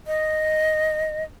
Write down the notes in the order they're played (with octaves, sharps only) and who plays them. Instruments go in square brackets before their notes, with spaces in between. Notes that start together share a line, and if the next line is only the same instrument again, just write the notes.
[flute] D#5